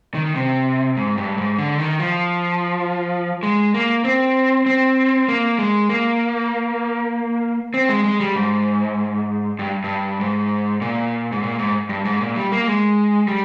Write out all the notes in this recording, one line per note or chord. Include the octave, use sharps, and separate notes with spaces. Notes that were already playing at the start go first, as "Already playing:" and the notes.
D#3
C3
G#2
G2
G#2
D3
D#3
F3
G#3
A#3
C4
C4
A#3
G#3
A#3
C4
G#3
G#3
G3
G#2
G2
G2
G#2
A#2
G#2
A#2
G#2
G2
G#2
A#2
G3
A#3
G#3
G3